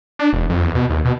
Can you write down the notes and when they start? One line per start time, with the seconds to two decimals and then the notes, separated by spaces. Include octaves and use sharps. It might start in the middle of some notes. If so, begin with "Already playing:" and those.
0.19 D4
0.33 E1
0.50 F2
0.63 E2
0.75 B2
0.90 D#2
1.05 B2